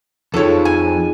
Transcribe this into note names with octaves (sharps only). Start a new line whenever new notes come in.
F2 D#4 F4 G#4 A4 C#5
G#5